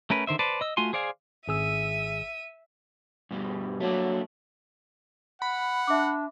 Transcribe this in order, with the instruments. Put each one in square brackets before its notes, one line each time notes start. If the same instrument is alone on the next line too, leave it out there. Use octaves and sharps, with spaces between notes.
[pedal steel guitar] A3 C#4 A#4 B4
D3 D#3 C5 E5
B4 C5 D5 A5
D#5 E6
A3 F4 F#4 G#5 C6
G#4 C5 D5 F5 G#5
[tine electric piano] G#1 G#4 E6 [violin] E5 D#7
[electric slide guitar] G2 B2 G3
[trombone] F#3 [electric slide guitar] A3 A#3 D4
[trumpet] F#5 [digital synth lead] B5
[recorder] D4 [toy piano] E5 D6